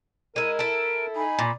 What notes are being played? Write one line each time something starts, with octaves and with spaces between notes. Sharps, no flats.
G#3 E4 A#4 D#7
E4 A4 D7
D#4 G#5 B5
A#2